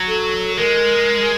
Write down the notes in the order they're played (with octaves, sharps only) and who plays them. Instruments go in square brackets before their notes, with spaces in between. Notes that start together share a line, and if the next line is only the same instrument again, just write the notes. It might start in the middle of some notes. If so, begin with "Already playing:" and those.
Already playing: [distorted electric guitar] F#3
[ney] A4
[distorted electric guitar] G#3 [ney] A#4